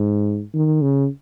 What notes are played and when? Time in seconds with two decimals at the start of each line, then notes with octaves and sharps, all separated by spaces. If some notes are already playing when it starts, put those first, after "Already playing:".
Already playing: G#2
0.54 D#3
0.82 C#3